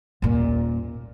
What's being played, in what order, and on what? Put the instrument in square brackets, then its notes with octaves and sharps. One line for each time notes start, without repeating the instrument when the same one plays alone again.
[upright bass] D#1 A#2